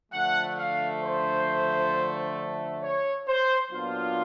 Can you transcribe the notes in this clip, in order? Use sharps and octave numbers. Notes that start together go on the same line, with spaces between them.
D3 F3 A3 F#5
F5
C5
C#5
C5
A#2 F#3 B3 D4 F4